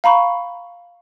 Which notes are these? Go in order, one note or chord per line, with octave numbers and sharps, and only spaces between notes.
F5 A#5 B5 C#6